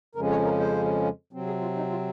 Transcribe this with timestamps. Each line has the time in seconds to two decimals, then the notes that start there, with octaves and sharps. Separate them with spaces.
0.15 F2 C#3 F3 G#3 C#4 A#4
0.30 C#5
0.45 A#4
0.60 C5
1.33 C3 F#3 C4
1.47 G#4
1.61 F4
1.77 D#4
1.91 F4